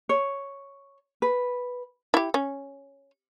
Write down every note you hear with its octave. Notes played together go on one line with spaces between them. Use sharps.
C#5
B4
E4 G4
C#4